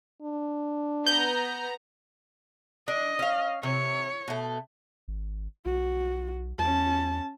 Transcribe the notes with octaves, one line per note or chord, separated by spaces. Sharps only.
D4
B3 A#5 G6
D4 D#5
C#4 F5
C3 C#5
B2 A3
G#1
B1 F#4
E2 C#4 A5